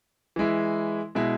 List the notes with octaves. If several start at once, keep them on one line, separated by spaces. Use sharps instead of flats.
E3 G#3 E4
B2 G#3 E4